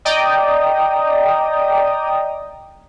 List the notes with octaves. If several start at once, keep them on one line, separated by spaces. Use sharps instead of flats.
D5 D#5 G5 A#5 D#6